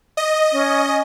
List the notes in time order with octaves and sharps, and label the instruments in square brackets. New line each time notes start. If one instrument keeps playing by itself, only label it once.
[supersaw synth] D#5
[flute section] C#4